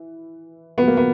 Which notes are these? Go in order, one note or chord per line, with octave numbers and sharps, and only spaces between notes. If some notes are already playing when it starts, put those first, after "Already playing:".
Already playing: E3
A#2 F#3 B3
A#3
B3